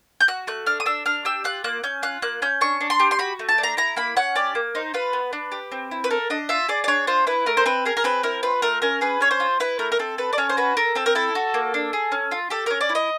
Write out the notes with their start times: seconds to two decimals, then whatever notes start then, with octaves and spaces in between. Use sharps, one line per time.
0.20 G6
0.28 F#4 F#6
0.47 A3 F#6
0.66 D4 F6
0.80 D#6
0.86 D4 E6
1.06 D4 F6
1.25 G4 E6
1.44 F4 F#6
1.64 A#3 F#6
1.83 C#4 G6
2.03 F4 F#6
2.22 A#3 F#6
2.42 C#4 G6
2.61 D4 C#6
2.81 D4
2.90 C6
3.00 G4
3.11 C6
3.19 F#4 B5
3.39 A3
3.49 A5
3.58 D4
3.63 A#5
3.77 E4 A#5
3.96 A#3 B5
4.16 C#4 F#5
4.35 G4 D5
4.55 A#3
4.75 D#4 C5
4.94 F4 B4
5.13 B3
5.33 D4
5.52 G4
5.72 C4
5.91 E4
6.04 B4
6.10 A4 A#4
6.30 D4 D#5
6.49 F4 E5
6.68 G#4 D5
6.84 D5
6.88 D4 C#5
7.07 F4 C5
7.27 E4 B4
7.46 A3 A#4
7.57 C5
7.66 C4 B4
7.85 G#4 A#4
7.97 A#4
8.04 C4 B4
8.23 E4 A#4
8.43 F4 B4
8.62 A3 A#4
8.82 C#4 A#4
9.01 G#4 B4
9.20 C#4 C#5
9.31 C5
9.40 F4
9.60 E4 B4
9.79 A3 A#4
9.92 A#4
9.99 C4 A4
10.18 A4 B4
10.33 D5
10.38 C#4 C#5
10.49 C5
10.57 F#4 B4
10.77 A4 A#4
10.95 C4 A4
11.06 A#4
11.15 E4 A4
11.35 F#4
11.54 A#3
11.74 D4
11.93 G#4
12.12 C#4
12.31 F4
12.50 G4 A4
12.66 C#4 A#4
12.81 D5
12.89 E4
12.95 D#5